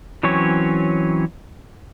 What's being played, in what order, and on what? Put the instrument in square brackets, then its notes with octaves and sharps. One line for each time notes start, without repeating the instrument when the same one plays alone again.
[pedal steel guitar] E3 F#3 C4 C#4 C#5